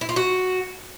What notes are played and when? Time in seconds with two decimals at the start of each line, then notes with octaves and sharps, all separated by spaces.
0.01 E4
0.09 F4
0.16 F#4